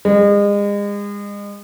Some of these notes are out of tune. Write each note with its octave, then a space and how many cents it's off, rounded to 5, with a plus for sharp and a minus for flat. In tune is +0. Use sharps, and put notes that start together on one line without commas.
G#3 -35